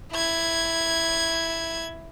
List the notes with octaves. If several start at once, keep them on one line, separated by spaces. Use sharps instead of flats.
E4 G#6